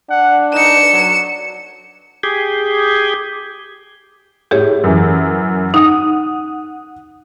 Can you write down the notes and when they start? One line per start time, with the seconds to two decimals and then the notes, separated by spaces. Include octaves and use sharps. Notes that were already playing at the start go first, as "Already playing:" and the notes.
0.10 D4 F#5
0.53 D#4 C#7 E7
0.92 F#3
2.23 G4 G#4
4.51 A2 G4 G#4 C#5
4.84 F#2 E3
5.74 D#4 F#5 D#6